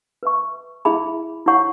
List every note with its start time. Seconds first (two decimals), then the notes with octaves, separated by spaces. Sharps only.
0.23 B4 E5 C#6
0.85 E4 G#4 E5 B5
1.46 E4 C#5 F#5 C#6